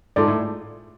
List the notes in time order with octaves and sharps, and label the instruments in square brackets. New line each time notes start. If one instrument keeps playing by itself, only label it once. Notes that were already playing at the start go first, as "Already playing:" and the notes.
[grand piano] G#2 [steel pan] F4 A4 D5
[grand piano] A2